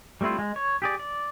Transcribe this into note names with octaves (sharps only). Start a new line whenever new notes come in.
G3 A3 C4 E4 F4
G#3
C#5
G4 G#4 D5
D5